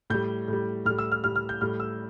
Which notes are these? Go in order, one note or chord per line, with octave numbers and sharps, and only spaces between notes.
A2 G3 G6
A2 G3
A2 F6
G3
E6
F6
A2 G3 F6
F6
G6
A2 G3 F6
E6